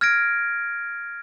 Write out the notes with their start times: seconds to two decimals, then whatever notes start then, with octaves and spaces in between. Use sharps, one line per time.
0.01 F6 G#6 A#6 D7